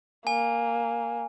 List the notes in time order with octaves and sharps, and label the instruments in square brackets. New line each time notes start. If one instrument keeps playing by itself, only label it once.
[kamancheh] A#3 [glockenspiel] G#5